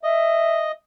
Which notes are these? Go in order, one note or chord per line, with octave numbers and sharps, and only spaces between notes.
D#5 E5